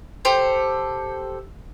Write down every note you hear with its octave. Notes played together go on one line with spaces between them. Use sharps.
G4 A4 C5